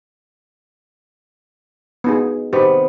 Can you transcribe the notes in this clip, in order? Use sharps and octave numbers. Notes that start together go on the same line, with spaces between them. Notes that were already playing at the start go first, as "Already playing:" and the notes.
B3 D#4 G#4
C3 D#3 B3 G4